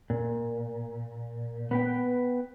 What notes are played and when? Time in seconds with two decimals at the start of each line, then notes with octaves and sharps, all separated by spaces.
0.10 A#2
1.71 B3 B4 G5